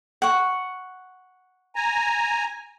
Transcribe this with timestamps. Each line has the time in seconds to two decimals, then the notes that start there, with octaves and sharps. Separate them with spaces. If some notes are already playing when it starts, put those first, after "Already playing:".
0.22 F#5 C#6
1.76 G#5 A#5